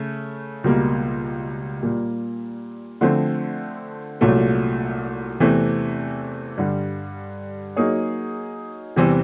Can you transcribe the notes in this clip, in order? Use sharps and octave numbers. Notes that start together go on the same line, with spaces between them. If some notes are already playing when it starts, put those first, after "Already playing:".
Already playing: C#3 A3
C#2 B2 G3 A#3
A#2 G3 A#3
D3 F3 A3 C4
C2 A#2 F#3 A3
E2 C3 E3 A3 C4
G2 D3 G3
F#3 A#3 D#4 G#4 C#5
E2 C3 E3 G3 C4